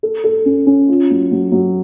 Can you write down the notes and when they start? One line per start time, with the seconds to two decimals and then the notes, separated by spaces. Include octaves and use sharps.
0.03 A4
0.24 A4
0.46 C#4
0.67 C#4
0.88 F4
1.10 F#3
1.31 F#3
1.52 F#3